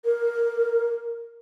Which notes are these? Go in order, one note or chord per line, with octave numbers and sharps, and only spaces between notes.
A#4